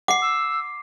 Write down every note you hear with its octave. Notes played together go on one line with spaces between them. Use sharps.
F#5 D6 C7
E6